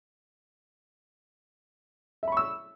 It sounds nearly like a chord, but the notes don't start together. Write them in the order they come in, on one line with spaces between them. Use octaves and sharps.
E5 B5 C#6 E6